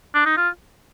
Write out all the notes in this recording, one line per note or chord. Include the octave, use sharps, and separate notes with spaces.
D4
D#4
F4